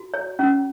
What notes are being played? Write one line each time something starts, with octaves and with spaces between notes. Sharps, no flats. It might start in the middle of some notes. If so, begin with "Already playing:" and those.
Already playing: F#4
C#5
C#4